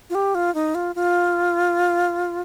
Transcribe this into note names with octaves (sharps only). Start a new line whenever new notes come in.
F4
G4
F4
D#4
F4
F4